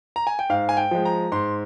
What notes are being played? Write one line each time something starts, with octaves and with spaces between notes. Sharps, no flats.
A#5
G#5
G5
G#2 F5
G#5
G5
F3 G#3
A#5
G#2 C6